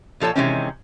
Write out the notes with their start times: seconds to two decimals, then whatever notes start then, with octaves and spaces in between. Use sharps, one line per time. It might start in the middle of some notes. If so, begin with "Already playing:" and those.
0.20 A#2 F3 A4 C#5 A5
0.36 C3 D#3 E3 G#3 C4 C#4